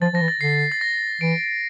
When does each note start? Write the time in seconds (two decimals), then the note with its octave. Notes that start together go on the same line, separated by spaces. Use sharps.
0.01 F3 A6
0.13 F3 A#6
0.21 E3
0.28 A6
0.41 D3 C7
0.72 A6
0.81 A#6
1.21 E3 D7